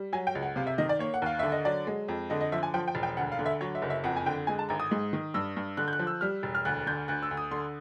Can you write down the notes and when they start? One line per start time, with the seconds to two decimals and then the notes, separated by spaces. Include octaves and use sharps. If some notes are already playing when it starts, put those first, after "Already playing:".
Already playing: G3
0.13 F#3 G#5
0.27 G5
0.35 C#2
0.42 F#5
0.56 C3 F5
0.67 E5
0.78 D#3 D#5
0.89 D5
0.99 A#3 C#5
1.14 F#5
1.22 D#2 F5
1.39 D3 E5
1.52 D#5
1.65 F#3 D5
1.87 G#3
2.08 F2
2.30 D3 D#5
2.41 D#5
2.52 F3 E5
2.63 G#5
2.74 F3 G5
2.88 G5
2.95 E1
3.03 G5
3.17 D2 F#5
3.32 F5
3.39 D3
3.46 E5
3.61 F#3 C#5
3.75 E5
3.82 F#1
3.90 E5
4.04 F2 F#5
4.16 G#5
4.26 D3 G5
4.47 G#3 G#5
4.59 A5
4.69 G#1 A#5
4.80 D#6
4.91 G#2
5.13 D#3
5.34 G2 E6
5.57 G2
5.77 D3 F#6
5.88 G6
5.93 F#6
5.99 F3
6.07 E6
6.21 G3 F6
6.43 E1
6.55 F6
6.65 D2 F#6
6.86 D3 G6
7.08 D2 F#6
7.23 E6
7.31 D2
7.37 D#6
7.51 D3 C6